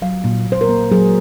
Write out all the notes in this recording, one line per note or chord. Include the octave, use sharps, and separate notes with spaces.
F#3 F5
A#2
A#2
C5
A#4
A#3
F#3 G#4